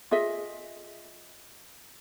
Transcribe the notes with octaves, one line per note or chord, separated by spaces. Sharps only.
F4 G#4 D#5 E5